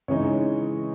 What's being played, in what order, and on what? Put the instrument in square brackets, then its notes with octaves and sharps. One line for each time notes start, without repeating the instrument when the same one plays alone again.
[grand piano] C#3 E3 G#3 D#4 C#5